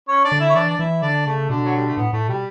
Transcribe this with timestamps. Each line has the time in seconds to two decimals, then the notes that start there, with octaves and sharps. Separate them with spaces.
0.08 C#4 C#5
0.24 D4 D5
0.31 D3
0.40 E4 E5
0.49 C#5
0.55 E3 D4 D5
0.69 D5
0.79 E3 E4 E5
1.02 D3 D4 D5
1.26 C#3 A3 A4
1.49 B2 D3 D4
1.65 F#3
1.76 G3
1.87 A3
1.96 A2 B3
2.13 A2 A3
2.28 B2 G3